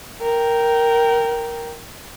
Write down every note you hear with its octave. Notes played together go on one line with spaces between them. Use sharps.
A#4 G5